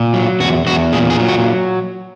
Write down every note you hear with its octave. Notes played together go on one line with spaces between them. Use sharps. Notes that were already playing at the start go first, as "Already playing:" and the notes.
Already playing: A#2
F#3
E2 F#4
E2 F#4
A#2 G#4
G#4
F#3
F#4